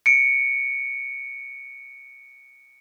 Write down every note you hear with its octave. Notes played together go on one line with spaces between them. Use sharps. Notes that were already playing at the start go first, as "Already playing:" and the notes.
C#7 D7